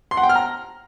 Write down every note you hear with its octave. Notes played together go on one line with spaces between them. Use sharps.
C6
F#5
G5
F6
A#5